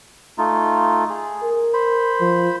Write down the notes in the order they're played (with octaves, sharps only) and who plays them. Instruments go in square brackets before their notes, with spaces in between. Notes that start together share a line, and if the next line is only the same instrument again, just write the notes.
[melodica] A3 D#4 F4
G#4
[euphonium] A#4
[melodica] C5 B5
[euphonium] F3